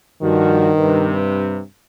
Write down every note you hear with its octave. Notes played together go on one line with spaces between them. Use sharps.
G2 D#3 F3 F#4
G2 C3 B4